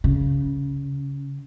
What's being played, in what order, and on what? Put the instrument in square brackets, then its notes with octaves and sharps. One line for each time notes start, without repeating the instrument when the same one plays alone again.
[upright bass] C#3